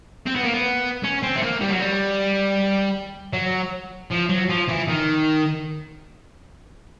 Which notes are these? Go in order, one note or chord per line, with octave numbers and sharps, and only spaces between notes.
C4
B3
A#3
B3
C#4
C4
A3
A#3
G3
F#3
G3
F#3
F3
F#3
F3
E3
D#3